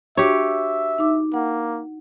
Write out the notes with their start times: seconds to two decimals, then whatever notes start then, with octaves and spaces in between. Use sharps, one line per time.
0.17 D4 F#4 G4 C#5 E5 C#6
0.98 D#4 D6
1.34 A#3 F#5